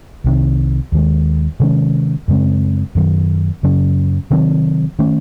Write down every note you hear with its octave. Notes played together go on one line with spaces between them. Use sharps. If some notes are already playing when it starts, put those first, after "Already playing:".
C2 C3 D#3
D#2 D#3 G#3
C3 D#3 G#3 C#4
F#2 C#3 G#3 C4
F#2 D#3 F#3
F#2 C#3 F#3 C#4
C3 D#3 F#3 C4
D#3 A3 C#4